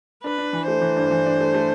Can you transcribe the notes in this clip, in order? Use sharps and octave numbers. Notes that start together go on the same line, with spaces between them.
D4 B4
D4
E3
A3 C5
E3
G2
E3
D4
A3
A3